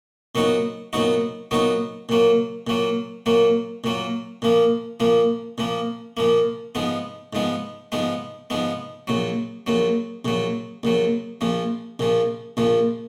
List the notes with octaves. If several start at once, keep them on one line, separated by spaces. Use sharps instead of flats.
A#2 F#3 B3 D#4 F#4
A#2 F#3 B3 D#4 F#4
A#2 F#3 B3 D#4 F#4
A#2 F#3 A#3
A#2 F#3 A#3
A#2 F#3 A#3
A#2 F#3 A#3
A#2 F3 A#3
A#2 F3 A#3
A#2 F3 A#3
A#2 F3 A#3
G#2 F3 G#3 B3
G#2 F3 G#3 B3
G#2 F3 G#3 B3
G#2 F3 G#3 B3
A#1 A#2 F#3
A#1 A#2 F#3
A#1 A#2 F#3
A#1 A#2 F#3
A#1 A#2 F3
A#1 A#2 F3
A#1 A#2 F3